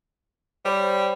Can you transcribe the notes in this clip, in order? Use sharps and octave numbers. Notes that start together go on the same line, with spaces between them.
G3 C5 C#5 B5